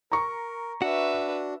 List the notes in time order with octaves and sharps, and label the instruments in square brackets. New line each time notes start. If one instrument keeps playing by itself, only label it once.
[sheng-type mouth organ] A#4 [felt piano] A#5 C#6
[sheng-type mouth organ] D4 [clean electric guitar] F#4 [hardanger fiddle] B4 E5